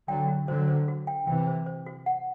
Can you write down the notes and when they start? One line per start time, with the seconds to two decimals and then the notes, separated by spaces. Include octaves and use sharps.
0.08 D3 F#3 G5
0.28 F#4
0.48 D3 F#3 C5
0.68 C5
0.88 F#4
1.07 G5
1.27 C3 E3 G5
1.47 C5
1.66 C5
1.86 F#4
2.06 F#5